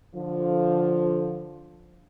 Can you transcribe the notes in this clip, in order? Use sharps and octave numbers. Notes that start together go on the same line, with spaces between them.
D3 F3